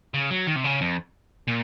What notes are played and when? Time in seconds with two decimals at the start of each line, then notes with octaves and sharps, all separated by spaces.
0.14 C#3
0.31 F#3
0.47 D#3
0.56 C3
0.64 C#3
0.81 F2
1.48 A#2